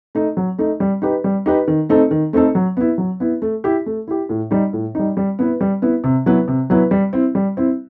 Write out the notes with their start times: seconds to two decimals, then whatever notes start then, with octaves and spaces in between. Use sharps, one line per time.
0.15 A3 D#4
0.37 F#3
0.58 A3 D#4
0.80 G3
1.02 D#4 G4 B4
1.24 G3
1.46 D#4 G4 B4
1.68 D#3
1.89 A3 C4 D#4 A4
2.11 D#3
2.33 A3 C4 D#4 A4
2.55 F#3
2.77 B3 E4
2.98 F#3
3.20 B3 E4
3.42 A3
3.64 E4 G4
3.86 A3
4.08 E4 G4
4.29 A2
4.51 G3 D#4
4.73 A2
4.95 G3 D#4
5.17 G3
5.39 B3 E4 B4
5.61 G3
5.82 B3 E4 B4
6.04 C3
6.26 F#3 B3 E4 B4
6.48 C3
6.70 F#3 B3 E4 B4
6.91 G3
7.13 C4 E4
7.35 G3
7.57 C4 E4